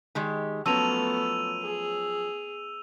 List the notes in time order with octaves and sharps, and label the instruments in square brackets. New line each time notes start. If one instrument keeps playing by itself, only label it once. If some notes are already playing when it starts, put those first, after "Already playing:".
[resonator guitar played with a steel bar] D#3 G#3 G4
[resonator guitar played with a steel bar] F3 F#3 C#4 [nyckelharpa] A3 B3 [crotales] E6 D#7 F7
[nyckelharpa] G#4